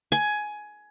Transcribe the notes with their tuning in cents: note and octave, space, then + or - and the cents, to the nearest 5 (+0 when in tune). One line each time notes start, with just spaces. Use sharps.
G#5 +15